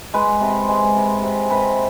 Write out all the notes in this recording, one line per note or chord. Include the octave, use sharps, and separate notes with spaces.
G#3 B4
C3
G#3
C3
C3
C3 B4